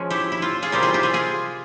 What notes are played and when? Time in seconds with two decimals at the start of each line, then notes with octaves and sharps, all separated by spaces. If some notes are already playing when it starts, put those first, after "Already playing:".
Already playing: F3 G#3 C#4
0.10 E4 G4
0.32 E4
0.42 F4
0.62 F4 G#4
0.72 C3 G3 C4 E4 G4 A#4
0.83 F4 G#4
0.94 E4 G4
1.03 F4 G#4
1.14 F4 G#4